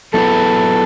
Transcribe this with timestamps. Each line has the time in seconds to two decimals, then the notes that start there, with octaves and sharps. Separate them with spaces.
0.14 F#3 B3 E4 G#4 A4 B4